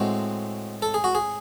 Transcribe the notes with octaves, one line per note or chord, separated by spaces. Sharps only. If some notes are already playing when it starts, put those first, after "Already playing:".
Already playing: A2 G#3 C4 F#4
A4
G#4
F#4
G#4